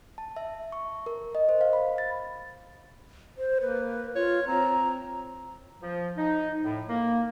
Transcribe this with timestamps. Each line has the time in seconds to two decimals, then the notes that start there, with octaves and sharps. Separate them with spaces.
0.18 A5
0.36 E5
0.72 C#6
1.06 A#4
1.35 D#5
1.49 C5
1.61 F5
1.73 B5
1.98 A6
3.38 C5
3.61 A#3 B4
4.15 F4 C#5
4.47 C4 A#5
5.82 F3
6.17 D#4
6.64 A2
6.88 A#3